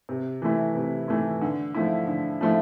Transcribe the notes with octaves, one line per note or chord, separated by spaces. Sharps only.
C3
E3 A3 E4
C3
E3 A3 E4
D3
F3 A3 E4
D3
F3 A3 E4